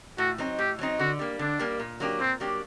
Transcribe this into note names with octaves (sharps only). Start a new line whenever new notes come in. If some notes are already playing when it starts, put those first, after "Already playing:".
A2 F#4
F#3 C4 D#4
A2 G4
F#3 C4 D#4
D3 F#4
G3 A#3
D3 D4
G3 A#3
A#2
F#3 A#3 D4 G4
A#2 C4
F#3 A#3 D4 G4